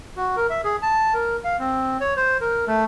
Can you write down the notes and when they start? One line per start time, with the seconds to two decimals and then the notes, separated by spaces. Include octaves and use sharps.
0.17 F#4
0.37 A#4
0.50 E5
0.64 G#4
0.82 A5
1.14 A#4
1.44 F5
1.59 C4
2.00 C#5
2.16 C5
2.41 A#4
2.67 A3